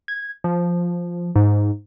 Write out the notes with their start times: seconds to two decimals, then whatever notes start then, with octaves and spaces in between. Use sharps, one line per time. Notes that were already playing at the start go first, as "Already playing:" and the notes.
0.08 G#6
0.44 F3
1.36 G#2